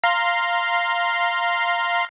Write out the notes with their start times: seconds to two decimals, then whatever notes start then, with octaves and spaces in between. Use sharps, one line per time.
0.04 F5 A#5 C6